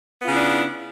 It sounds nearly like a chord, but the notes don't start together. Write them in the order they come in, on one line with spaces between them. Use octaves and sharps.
B3 F4 C#3 E4 D4